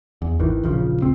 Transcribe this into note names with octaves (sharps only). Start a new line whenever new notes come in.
E2
G#1 D#3 E3
D#1 A#1 C#3 F3
C#2 C4